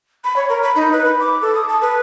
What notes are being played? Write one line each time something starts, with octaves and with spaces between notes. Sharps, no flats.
B5
C#5
A#4
B5
D#4
B4
B5
D6
A4
D#6
A5
B4